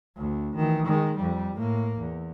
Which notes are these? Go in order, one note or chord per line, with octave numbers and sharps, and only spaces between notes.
D2
D#3 E3
D#3 G#3
F2 G3
A2 A#3
E2